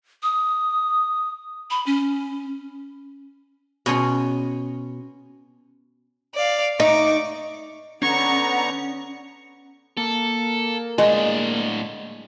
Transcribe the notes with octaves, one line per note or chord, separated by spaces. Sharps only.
D#6
B5
C#4
B2 C#4 C#5 C6
D5 F5
D#4 C#6 D6
D3 B3 C#4 A#5 C#6
A#3 A4
A2 G#3 D4